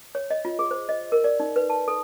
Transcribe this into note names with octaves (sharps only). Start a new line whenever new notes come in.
C#5
D#5
F4
G#4
C5
D#5
A#4
D5
D#4
B4
A5
A4